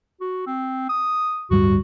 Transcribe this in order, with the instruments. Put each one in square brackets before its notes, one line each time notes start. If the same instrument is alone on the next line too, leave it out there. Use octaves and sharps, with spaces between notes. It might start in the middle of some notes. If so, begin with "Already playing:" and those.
[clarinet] F#4
C4
D#6
[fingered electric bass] D1 G2 G3 [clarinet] F#4